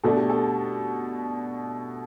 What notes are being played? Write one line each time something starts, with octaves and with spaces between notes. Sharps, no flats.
B2 A3 D4 A4
G4
A4